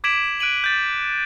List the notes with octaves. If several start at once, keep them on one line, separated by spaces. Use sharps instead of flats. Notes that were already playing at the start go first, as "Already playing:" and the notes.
D6 G#6 B6 D7 E7 F#7
F#6 D7 D#7 F#7
G6 A6